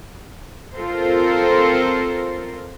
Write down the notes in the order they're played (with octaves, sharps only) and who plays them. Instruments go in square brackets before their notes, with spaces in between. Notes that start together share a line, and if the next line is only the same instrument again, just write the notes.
[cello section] C4 F4 A4 A#4 C5